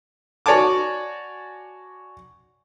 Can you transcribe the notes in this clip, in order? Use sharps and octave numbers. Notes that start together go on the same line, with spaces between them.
F#4 C#5 D5 G#5 A5 D6